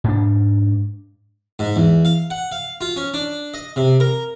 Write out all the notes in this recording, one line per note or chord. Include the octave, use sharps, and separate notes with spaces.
G#2 D4
G#2
E2
F5
F#5
F5
F4
C#4
D4
D#5
C3
A#4